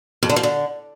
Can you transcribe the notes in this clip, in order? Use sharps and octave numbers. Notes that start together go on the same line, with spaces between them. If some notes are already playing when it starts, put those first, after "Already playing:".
F2
D3
F3
D3